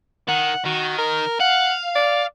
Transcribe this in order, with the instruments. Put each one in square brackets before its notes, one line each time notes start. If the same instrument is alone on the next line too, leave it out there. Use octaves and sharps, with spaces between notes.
[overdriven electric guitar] D#3 [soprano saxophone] F#5
[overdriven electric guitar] D#3 [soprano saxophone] F#4
[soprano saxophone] A#4
[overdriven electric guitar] F5 [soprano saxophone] F#5
[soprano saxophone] D5